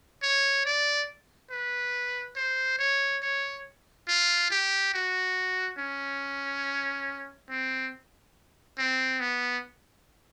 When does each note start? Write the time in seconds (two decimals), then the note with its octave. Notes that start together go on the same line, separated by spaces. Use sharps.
0.23 C#5
0.66 D5
1.51 B4
2.36 C5
2.79 C#5
3.22 C#5
4.08 F4
4.51 G4
4.94 F#4
5.79 C#4
7.49 C4
8.78 C4
9.20 B3